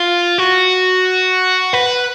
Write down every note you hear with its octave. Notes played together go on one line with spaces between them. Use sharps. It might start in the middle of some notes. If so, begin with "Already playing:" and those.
Already playing: F4
F#4
B4